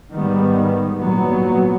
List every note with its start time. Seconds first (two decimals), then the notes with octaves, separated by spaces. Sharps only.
0.12 G#2 D#3 G3 B3
1.00 A#2 F#3 B3